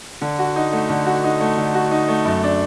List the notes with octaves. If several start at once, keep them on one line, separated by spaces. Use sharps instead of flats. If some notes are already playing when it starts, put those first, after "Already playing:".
D3
F#4
D#4
A3
D3
F#4
D#4
A3
D3
F#4
D#4
A3
F#2
D4